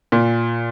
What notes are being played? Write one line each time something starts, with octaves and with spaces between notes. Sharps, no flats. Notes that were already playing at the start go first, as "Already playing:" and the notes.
A#2